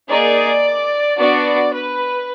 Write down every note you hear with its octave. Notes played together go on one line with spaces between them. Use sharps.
A#3 D#4 G#4 D5
B3 D4 F#4 D5
B4